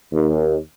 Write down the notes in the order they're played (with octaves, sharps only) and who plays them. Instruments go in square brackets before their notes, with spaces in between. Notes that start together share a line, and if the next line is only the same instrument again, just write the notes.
[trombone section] D#2